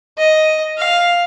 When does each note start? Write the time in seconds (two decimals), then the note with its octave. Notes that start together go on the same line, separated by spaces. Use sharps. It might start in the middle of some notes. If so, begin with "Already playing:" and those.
0.18 D#5
0.77 F5